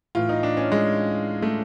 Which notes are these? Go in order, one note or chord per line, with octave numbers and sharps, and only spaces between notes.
A2 E3 F4
D#4
D4
C#4
G#3
A3